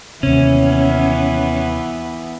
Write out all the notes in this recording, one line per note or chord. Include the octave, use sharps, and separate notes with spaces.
D#2 C3 E3 B3 C#4